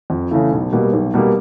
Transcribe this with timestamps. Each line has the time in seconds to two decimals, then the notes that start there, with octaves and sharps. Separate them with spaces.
0.10 F2
0.31 C#3 E3 A3
0.52 B1
0.72 B2 G3 A#3
0.93 B1
1.14 B2 G3 A#3